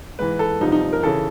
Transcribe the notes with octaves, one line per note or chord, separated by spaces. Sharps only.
G#2 E3 B4
A4
C2 C3 F3 D#4
D#4
A#4
C#3 E3 A4